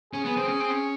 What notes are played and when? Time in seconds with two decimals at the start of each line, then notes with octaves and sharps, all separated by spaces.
0.13 C#4 G#4
0.25 B3
0.37 C4
0.48 C#4
0.60 C4
0.70 C#4